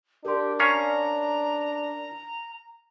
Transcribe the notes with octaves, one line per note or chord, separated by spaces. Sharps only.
D4 G4 A#4 C6
C#4 C#5 F5 A#5